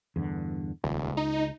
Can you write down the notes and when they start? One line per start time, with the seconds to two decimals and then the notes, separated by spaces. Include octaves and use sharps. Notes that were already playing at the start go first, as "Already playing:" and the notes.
0.16 E2 G2 D3
0.84 D#1 C#2
1.17 D#4